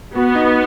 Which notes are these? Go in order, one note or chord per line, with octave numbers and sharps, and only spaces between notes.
B3 F#4
D#4